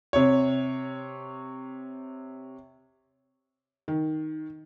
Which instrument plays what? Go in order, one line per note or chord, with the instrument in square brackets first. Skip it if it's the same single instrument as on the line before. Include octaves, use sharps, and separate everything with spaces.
[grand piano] C3 C#5
[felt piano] D#3